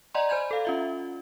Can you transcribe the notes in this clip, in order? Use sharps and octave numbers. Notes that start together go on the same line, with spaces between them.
D5 D#5 F#5 G#5 A#5 C6
C5 D5 G#5 B5 G6 G#6
A4 F5
C#4 F4 E5